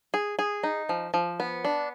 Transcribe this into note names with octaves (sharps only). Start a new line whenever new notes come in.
G#4
G#4
D#4
F3
F3
B3
D4